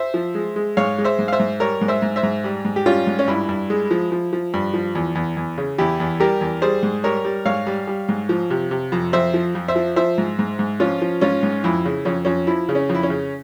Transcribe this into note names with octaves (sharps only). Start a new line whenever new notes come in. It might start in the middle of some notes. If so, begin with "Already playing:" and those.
Already playing: C5 E5
F3
G#3
G#3
G#2 C#5 F5
G#3
C5 E5
G#2
F5
C5 E5
G#2
G3 A#4 C#5
G#2
C5 E5
G#2
C5 E5
G#2
G3
G#2
G4
G3 C#4 F4
G#2
C#4
G2 E4
G2
G#3
F3
F3
F3
G2
F3
E2
E2
E2
C#3
E2 E4 G4
E2
G3 G4 A#4
E2
G3 G#4 C5
G#2
G3 A#4 C#5
G3
G#2 C#5 F5
G3
G3
G#2
F3
C3
C3
F2
F2 C5 E5
F3
F2
C5 E5
F3
F3 C5 E5
G#2
G#2
G#2
F3 C#4 F4
F3
G#2 C#4 F4
G#2
F2 E4
C#3
F2 C#4
F2 C#4
F3 E4
C#3
C#4
F2
E4
C#4
C#3